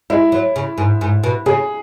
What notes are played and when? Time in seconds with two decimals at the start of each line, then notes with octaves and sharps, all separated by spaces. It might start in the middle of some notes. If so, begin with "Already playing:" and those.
0.10 G#3 E4
0.32 F#3
0.56 C#3
0.78 G#2
1.01 G#2
1.24 B2
1.46 C#3 G#4